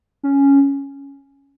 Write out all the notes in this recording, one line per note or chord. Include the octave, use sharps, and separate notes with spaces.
C#4